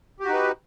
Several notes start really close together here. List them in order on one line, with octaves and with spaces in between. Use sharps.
G4 F#4 D#4 B4